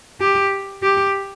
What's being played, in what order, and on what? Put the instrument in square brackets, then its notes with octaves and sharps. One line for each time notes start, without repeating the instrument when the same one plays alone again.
[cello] G4
G4